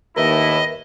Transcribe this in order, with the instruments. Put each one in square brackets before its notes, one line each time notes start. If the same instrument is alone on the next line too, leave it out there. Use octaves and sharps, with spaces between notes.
[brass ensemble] D#2 A2 E4 [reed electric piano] A#4 B4 E5 [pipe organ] D#5